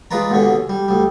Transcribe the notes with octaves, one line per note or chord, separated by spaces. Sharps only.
G#3 F4 B4 D5 A#5
D#2 B2 D3 C#4
G3
D2 G3